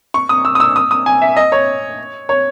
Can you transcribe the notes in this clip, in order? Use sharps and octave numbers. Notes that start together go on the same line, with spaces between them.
C#6
D#6
E6
D#6
E6
D#6
D#6
G#5
E5
D#5
C#5
C#5